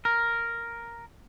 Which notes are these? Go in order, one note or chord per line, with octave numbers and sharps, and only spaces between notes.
A#4